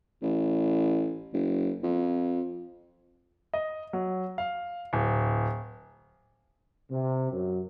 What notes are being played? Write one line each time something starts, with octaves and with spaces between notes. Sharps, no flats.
A1
F#1
F2
D#5
F#3
F5
D1
C3
F#2